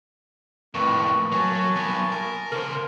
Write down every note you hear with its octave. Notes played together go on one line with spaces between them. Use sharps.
F2 A2 A#3 B4 C#6
F#3 G#5 A5
F#3 B3
A#4
C#3 A#4 C5